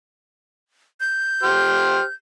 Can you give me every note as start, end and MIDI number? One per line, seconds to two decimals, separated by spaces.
1.00 2.14 91
1.43 2.03 67
1.43 2.03 72
1.43 2.03 89